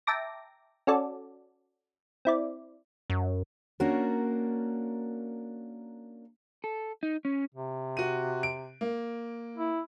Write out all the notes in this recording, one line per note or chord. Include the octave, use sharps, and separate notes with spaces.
E5 G5 A5 A#5 D6 A#6
C#4 F#4 A4 D5
C4 E4 D5
F#2
A#3 C#4 D4 F#4 A#4
A4
D#4
C#4
C3
F#4 D#7
D7
A#3
E4